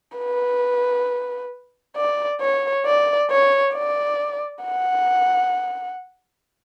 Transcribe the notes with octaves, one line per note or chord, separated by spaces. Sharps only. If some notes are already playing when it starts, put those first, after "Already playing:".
B4
D5
C#5
D5
C#5
D5
F#5